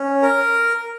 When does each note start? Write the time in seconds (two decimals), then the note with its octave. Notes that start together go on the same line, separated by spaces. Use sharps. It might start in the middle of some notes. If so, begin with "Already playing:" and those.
Already playing: C#4
0.22 A#4